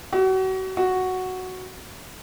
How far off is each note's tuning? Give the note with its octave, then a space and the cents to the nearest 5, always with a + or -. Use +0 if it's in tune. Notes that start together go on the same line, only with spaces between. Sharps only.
F#4 +35
F#4 +0